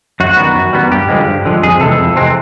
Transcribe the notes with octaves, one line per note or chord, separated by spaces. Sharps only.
F#2 F#4
D#3 G3 B3
F#2
D#3 G3 B3
G2 G4
D3 F3 G#3
G2
D3 F3 G#3
F2 G#4
C3 E3 G#3 C4 A4
F2
C3 E3 G#3 C4